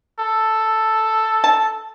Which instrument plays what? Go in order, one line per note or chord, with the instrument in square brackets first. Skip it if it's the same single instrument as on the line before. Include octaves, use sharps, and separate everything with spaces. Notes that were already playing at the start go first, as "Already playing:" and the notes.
[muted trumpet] A4
[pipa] A5